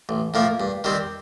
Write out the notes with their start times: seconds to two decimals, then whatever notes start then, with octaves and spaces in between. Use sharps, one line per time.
0.09 A1
0.34 A2 F3 A#3
0.60 G2
0.84 D#3 G3 C4